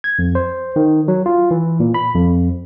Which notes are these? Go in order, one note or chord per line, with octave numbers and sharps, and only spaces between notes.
G#6
F2
C5
D#3
F#3
F4
E3
A#2
B5
F2